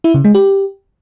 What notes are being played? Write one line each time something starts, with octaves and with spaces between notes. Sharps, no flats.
E4
C#3
G#3
G4